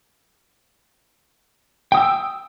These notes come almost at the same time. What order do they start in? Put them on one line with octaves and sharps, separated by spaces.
G5 D#6 E6